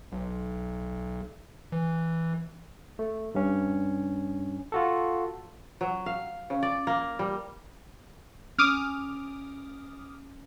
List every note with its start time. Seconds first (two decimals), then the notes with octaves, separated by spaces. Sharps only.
0.12 B1
1.72 E3
2.99 A3
3.35 G2 C#4
4.72 F4 F#4 A4
5.81 F#3
6.06 F5
6.50 C#3
6.63 D5
6.87 A#3
7.19 G3
8.58 C#4 D6 D#6 F6